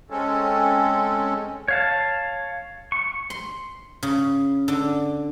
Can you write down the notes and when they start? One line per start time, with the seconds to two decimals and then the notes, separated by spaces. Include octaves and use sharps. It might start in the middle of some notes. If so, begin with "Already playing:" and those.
0.10 G#3 C4 C#4 A4
1.68 C#5 F5 A5
2.92 C#6
3.30 C6
4.03 C#3
4.68 D3